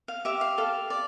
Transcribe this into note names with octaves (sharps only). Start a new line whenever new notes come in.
F5
G4 E5
F5
A4 F5
D5